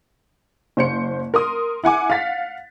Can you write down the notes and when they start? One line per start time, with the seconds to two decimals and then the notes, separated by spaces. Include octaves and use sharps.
0.77 F#1 C5 C#7
1.34 A#4 C6 D#6
1.84 E4 F#5 G#5 D6
2.10 F5 F#5 A6 B6